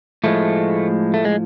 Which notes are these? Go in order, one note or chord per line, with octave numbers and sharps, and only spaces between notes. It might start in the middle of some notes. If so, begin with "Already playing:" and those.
A2 F3 G#3 A3
A3
G#3